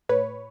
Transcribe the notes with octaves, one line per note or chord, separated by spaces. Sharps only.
A2 B4 C#5